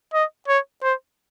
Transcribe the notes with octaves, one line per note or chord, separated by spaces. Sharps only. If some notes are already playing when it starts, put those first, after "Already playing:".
D#5
C#5
C5